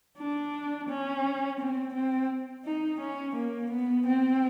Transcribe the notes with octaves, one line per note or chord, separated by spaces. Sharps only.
D4
C#4
C4
C4
D#4
C#4
A#3
B3
C4